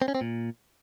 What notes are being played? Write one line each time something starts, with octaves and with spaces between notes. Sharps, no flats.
C4
C#4
C4
A#2